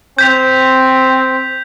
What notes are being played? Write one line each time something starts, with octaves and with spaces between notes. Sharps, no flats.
C4 G6 B6 F7